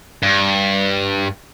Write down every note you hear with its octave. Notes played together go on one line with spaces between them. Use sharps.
G2